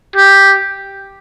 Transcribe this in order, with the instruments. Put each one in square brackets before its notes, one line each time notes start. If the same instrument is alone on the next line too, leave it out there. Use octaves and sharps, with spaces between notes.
[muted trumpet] G4